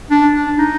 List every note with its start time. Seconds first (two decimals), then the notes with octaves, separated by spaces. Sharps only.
0.10 D4
0.35 D4
0.58 D#4